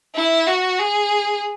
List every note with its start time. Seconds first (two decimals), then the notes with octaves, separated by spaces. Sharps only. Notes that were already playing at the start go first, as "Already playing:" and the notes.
0.15 E4
0.47 F#4
0.80 G#4